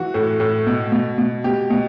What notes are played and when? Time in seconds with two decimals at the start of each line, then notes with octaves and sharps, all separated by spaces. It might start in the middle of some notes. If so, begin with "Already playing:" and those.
Already playing: E3 F#4
0.14 A2
0.40 A2
0.67 B2
0.92 B2
1.18 B2
1.44 B2 G4
1.70 B2